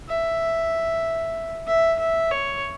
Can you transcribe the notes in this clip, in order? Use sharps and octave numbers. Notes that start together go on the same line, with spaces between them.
E5
E5
E5
C#5